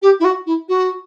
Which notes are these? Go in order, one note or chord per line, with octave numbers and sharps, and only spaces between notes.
G4
E4
F#4
E4
F#4